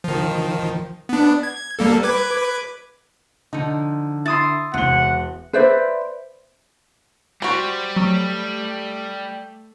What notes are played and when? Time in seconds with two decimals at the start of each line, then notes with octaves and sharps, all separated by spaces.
0.04 D#3 F3
1.09 B3 D4
1.43 G#6
1.79 G3 A#3 A4
2.03 B4 D6 G#6
3.53 D3 F3 D#4
4.25 E4 C6 D#6 A6
4.74 E1 C3 F#5 G7
5.53 B4 C5 D5 E5
7.42 G3 F#4 C5
7.96 F#3 A3